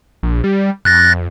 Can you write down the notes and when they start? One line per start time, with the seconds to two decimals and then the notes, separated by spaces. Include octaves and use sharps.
0.23 A#1
0.44 G3
0.85 F2 F#6 A6 A#6